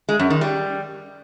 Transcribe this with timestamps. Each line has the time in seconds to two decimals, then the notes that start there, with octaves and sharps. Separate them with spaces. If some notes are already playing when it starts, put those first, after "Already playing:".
0.09 G#3
0.19 F#2
0.30 D#3
0.41 G3